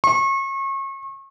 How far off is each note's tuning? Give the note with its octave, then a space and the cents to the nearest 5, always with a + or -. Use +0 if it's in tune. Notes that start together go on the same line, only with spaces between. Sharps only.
C#6 -35